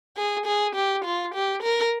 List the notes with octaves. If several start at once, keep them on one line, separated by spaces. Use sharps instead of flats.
G#4
G#4
G4
F4
G4
A#4